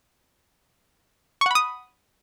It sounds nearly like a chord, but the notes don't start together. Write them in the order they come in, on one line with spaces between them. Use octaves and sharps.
C#6 F#5 B5 D#6